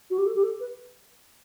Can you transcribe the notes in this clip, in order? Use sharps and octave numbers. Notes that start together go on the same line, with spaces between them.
F#4
G4
A4
G4
A4
B4